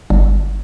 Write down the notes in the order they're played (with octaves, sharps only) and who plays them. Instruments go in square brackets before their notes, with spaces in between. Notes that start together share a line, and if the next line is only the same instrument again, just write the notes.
[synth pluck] G1